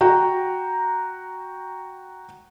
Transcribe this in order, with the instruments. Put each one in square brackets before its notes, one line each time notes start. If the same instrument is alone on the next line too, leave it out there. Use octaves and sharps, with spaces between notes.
[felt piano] F#4 G5 A#5